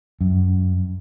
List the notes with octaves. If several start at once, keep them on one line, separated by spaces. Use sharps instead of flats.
F#2